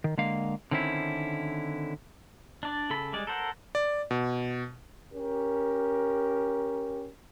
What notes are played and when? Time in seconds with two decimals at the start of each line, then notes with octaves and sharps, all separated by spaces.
0.04 D#3
0.18 D3 G#3 A#3 F5
0.71 D3 D#3 C4 C#4 E4
2.63 D4 D5
2.90 C#3 A4 B5
3.13 G3 G#3 D5
3.27 A4 A#4 C5 F#5
3.75 D5
4.11 B2
5.12 C#4 G4 A#4